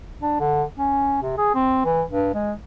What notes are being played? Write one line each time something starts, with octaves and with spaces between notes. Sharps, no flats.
D4
D3
C#4
C3
G#4
C4
E3
G2
G#3